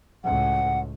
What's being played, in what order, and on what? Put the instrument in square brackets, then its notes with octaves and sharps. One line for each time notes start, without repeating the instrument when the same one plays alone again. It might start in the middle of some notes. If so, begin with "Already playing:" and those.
[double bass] C#2 A2 [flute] F#5